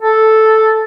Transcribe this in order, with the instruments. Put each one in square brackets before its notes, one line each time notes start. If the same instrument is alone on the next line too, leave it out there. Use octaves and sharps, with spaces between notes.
[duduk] A4